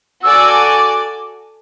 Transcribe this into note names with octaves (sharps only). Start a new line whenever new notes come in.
F#4 A4 D5 G#5 E6
D6
D6